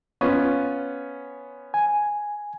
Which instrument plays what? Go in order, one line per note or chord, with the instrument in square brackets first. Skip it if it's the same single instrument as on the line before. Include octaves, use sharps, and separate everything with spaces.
[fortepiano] B3 C#4 F4
[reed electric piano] G#5